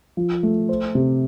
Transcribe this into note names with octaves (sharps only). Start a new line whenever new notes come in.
F3
A3
C5
C3